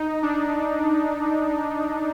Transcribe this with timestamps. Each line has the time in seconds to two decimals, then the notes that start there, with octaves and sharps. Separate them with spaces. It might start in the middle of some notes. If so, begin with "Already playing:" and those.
Already playing: D#4
0.22 D4